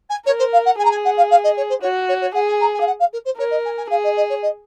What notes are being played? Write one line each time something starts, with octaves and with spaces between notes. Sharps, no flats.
G#5
A#4 C#5
C5
F5
F#5
G#4 G#5
A#5
G#5
F#5
F5
F5
D#5
C#5
C5
F#4 C#5
C#5
C#5
G#4 F#5
G#5
A#5
G#5
F5
F#5
F5
A#4
C5
A#4 C#5
D#5
G#5
G#5
G#4 F5
D#5
D#5
C#5
D#5